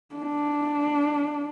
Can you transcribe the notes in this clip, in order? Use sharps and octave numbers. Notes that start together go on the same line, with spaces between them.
D4